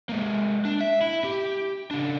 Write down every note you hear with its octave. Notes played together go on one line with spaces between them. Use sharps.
G#3 A#3
D4
E5
E4
G4
C#3 D4